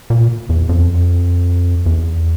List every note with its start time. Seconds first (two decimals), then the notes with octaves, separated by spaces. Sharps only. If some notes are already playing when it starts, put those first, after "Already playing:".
0.10 A#2
0.49 E2
0.69 F2
1.86 E2